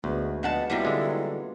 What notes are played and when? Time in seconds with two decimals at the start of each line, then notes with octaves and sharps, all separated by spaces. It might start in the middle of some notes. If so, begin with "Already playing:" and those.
0.04 D2 G#3 B3 F#4
0.43 F2 B3 D4 D#5 F#5 A5
0.70 C3 F#3 G3 A#3 B3 E4 F4
0.85 D3 G#3